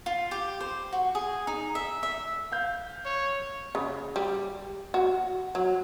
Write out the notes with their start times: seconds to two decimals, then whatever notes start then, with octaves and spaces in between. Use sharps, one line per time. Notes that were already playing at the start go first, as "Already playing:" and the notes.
0.06 F4
0.31 G4
0.60 C5
0.93 F#4
1.15 G#4
1.47 D#4
1.75 E5
2.03 E5
2.52 F5 G6
3.05 C#5
3.75 C#3
4.16 G3
4.94 F#4
5.55 F#3